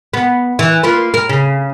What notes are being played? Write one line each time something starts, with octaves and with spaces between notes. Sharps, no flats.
B3
E3
A#3 F4 B4
A#4
C#3